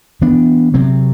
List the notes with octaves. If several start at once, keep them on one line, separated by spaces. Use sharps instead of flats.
E3 B3 D4
C3 F#3 C4